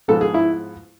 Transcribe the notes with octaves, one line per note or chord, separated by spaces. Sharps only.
G#2 F3 G#3 B3 A4
G#4
E4